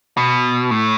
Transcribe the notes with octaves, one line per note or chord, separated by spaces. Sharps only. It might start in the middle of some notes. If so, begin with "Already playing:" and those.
B2
A2